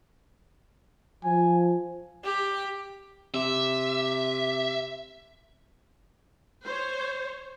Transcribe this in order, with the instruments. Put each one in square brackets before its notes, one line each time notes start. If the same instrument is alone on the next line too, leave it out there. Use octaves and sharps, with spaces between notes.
[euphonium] F3 [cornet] G#5
[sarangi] G4
[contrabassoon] C3 [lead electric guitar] E5
[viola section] C5 C#5